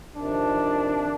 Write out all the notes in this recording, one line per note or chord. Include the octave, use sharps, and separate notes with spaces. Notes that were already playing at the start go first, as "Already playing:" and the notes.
F2 C3 D#3 D4